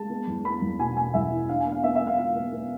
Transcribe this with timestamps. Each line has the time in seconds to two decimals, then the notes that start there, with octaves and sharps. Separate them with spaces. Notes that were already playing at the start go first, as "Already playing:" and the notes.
Already playing: G#3 A5
0.10 B3
0.27 E2
0.44 B3 B5
0.62 E2
0.79 B2 G#5
0.97 B2 G#5
1.14 E2 E5
1.32 E4
1.49 D4 F5
1.60 G#5
1.66 B3
1.72 F5
1.84 B3 E5
1.95 E5
2.01 B3
2.07 F5
2.18 F4 F5
2.35 B3
2.53 B3